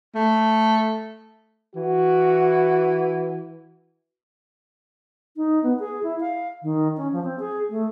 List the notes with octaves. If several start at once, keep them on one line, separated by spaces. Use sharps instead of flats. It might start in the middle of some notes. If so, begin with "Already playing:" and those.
A3
E3 F#4
D#4
B3
G#4
E4
F5
D#3
C#4
F3
C4
G#4
A3